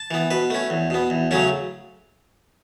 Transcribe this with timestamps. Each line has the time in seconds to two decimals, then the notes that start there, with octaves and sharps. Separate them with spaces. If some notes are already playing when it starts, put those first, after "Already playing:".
Already playing: A5
0.11 E3 B3
0.31 B2 B4
0.50 A3 C#4
0.70 E2
0.90 B2 B3
1.10 E2
1.31 C#3 F#3 A3 C#4